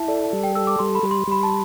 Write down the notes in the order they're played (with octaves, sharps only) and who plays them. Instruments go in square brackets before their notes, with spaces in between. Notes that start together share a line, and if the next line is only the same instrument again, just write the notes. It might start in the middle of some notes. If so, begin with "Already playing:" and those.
Already playing: [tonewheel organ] E4 [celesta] A5
[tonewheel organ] A4 [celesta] D5
[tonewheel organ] G3
[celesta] G5
[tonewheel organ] A4 [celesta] E6
[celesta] D6
[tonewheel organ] G3 [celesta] C6
[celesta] B5
[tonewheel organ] G3
[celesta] C6
[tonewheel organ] G3 [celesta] B5
[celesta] A5